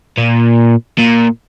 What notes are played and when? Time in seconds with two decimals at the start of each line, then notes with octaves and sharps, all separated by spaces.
0.18 A#2
0.99 A#2